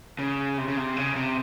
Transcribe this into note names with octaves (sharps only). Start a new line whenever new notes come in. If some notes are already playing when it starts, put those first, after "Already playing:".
C#3
C3
C#3
C3
C#3
C3